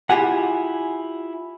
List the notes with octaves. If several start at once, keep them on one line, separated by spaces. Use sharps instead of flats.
E4 F4 G4 G#4 F#5